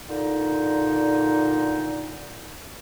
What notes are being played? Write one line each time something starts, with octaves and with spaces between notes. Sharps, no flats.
A#2 D3 D#4